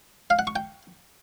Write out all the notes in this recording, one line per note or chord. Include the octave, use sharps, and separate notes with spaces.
F5
F#5
C#6
G5